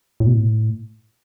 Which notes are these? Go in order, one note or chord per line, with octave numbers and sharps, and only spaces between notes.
A2
B2
A2